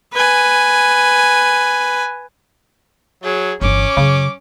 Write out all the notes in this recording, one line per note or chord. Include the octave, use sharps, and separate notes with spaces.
B4 G#5
F#3 G#4
G1 E3 C#4 D6
F#2 C#3